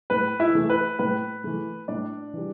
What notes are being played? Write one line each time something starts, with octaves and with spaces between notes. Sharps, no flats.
A2 B4
E4 E5
E3 A3
B4
A2 B4
E3 A3
A2 D4 D5
E3 G3